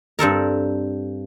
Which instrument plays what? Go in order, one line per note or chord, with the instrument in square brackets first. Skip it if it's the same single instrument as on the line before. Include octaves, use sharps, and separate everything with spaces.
[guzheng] G2 C4 A4 A#4